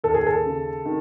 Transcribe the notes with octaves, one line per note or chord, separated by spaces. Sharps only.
D#2 A4
G#4
A4
C#3
D#3